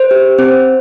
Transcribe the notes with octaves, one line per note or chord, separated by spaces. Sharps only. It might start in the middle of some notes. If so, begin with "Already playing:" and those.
Already playing: C5
G4
C4 C5